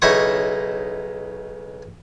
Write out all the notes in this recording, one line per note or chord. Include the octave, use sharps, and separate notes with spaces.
B1 C#3 D#4 E4 C#6 D#6